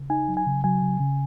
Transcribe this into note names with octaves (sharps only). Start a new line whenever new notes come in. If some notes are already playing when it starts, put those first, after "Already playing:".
Already playing: C#3
D#4 G#5
F#3
G#5
C#3
F#3 G#5
C#3
C#3